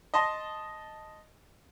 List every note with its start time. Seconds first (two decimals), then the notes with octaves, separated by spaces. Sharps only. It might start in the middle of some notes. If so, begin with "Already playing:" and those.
0.14 D#5 A5 C6